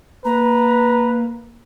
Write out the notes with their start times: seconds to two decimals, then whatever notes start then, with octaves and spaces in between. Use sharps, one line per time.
0.25 A#3 B4 A#5